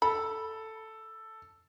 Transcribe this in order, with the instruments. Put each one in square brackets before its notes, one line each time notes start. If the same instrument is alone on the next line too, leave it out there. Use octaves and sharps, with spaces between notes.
[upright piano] A4 [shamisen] B5